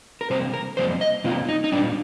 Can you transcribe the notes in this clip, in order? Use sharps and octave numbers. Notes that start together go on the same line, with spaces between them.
A#4
C3 G3 A#3 C5
A#4
F2 C3 G3 A#3 C5
D#5
C3 G3 A#3 F4
D#4
D#4
A#2 G3 A#3 D4